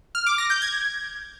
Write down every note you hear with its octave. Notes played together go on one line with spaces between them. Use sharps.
F6
D6
A#6
G6
G#6